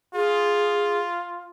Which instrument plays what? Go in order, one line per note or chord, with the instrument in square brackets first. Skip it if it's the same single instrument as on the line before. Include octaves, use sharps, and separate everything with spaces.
[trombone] F4 [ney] G#4